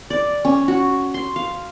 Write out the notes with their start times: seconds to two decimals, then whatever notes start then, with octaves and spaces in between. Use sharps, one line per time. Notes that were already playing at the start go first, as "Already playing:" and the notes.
0.10 D5
0.45 C#4
0.68 F#4
1.14 C6
1.36 F5